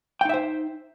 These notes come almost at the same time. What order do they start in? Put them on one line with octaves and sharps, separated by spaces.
G5 D#4 E5 C5